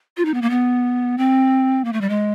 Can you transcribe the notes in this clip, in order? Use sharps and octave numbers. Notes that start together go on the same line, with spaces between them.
F4
D#4
B3
A#3
B3
C4
A#3
A3
G3
G#3